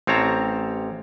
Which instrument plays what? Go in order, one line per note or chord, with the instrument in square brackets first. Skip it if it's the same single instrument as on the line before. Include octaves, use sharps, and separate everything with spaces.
[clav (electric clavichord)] A1 C4 C#5 A5 A#5